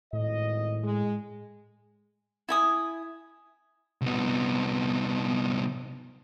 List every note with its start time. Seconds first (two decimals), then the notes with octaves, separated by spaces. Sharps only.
0.13 G#1 A2 D#5
0.83 G#3
2.49 E4 G#5 D#6
4.01 C2 B3